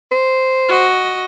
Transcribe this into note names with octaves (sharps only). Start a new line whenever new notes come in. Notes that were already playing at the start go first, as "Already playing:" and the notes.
C5
F#4 D#5